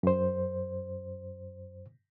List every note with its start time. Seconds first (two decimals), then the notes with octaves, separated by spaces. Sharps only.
0.03 F#2 C5